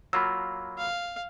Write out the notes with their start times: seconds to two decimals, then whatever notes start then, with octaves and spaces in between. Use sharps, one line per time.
0.13 F#3 A#3 F4 B5 E6
0.78 F5